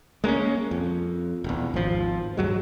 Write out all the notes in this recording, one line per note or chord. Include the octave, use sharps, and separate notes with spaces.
G#3 A#3 C4 C#4
F2
E1 E2
G#1 F3
G2 F#3 G#3